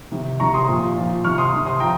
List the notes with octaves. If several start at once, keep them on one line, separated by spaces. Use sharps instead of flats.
C3 D#3
C3 D#3 A#5 C#6
C6 D#6
A#2 F3
A#2 F3
C3 D#3 C#6 F6
C6 D#6
C3 D#3
C6 D#6
F3 G5 A#5